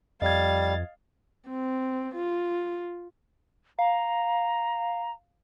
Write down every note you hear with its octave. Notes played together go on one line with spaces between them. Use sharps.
F2 G3 D#5 F5 G#6 A6
C4
F4
F5 A#5